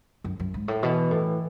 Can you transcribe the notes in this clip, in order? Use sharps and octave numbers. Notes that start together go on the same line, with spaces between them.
F#2
F#2
G#2
A2
B2 E3
A2